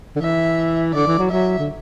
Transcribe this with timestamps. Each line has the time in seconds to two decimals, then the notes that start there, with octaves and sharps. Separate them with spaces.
0.16 D3
0.21 E3 E5
0.94 D3 D5
1.07 E3
1.19 F#3
1.31 F#3 E5
1.59 D3